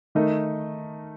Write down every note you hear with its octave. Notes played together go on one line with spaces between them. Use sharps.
D#3 A3 D#4 A#4